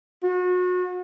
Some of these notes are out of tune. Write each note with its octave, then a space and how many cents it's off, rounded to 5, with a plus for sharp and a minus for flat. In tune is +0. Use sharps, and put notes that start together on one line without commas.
F#4 -35